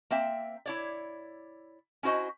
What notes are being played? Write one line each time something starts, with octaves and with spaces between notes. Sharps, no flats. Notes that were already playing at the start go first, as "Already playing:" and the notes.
A#3 C4 E5 G5
E4 C#5 D5
C#4 E4 F#4 C5 D#5